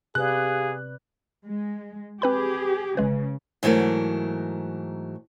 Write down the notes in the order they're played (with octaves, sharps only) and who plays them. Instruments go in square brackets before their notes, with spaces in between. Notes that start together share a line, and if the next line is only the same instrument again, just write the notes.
[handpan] C3 B4 D5 [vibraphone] G4 F5 [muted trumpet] G#4 [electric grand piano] F#6
[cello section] G#3
[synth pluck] C4 B4 B5 [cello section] G4 G#4
[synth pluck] G1 G#3 B4 [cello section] C#3
[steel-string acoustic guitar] G#2 E3 F#3 A3 A#4